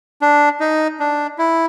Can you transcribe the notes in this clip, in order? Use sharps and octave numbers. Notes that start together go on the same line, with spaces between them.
D4
D#4
D4
E4